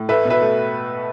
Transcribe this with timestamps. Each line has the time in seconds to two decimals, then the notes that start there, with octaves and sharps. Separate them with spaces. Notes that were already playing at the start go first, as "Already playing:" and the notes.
Already playing: A2
0.09 A3 B4 E5
0.25 B2
0.30 B4 E5
0.41 A3